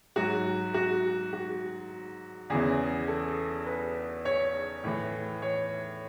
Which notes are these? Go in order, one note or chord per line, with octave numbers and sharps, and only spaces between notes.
G#2 F#3 F#4
F#4
F#4
E2 C#3 E3 G#4
A4
B4
C#5
A2 E3
C#5